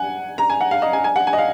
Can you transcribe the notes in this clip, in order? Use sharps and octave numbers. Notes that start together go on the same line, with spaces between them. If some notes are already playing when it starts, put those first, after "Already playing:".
Already playing: F#5 G#5
A#5
G#5
F#5
F5
D#5
G#5
G#5
F#5
G#5
D#5
F5